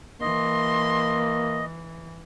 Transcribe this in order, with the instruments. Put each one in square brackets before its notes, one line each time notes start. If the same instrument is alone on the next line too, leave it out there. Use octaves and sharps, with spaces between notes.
[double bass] E3 [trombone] A#3 [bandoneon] D#5 [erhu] C6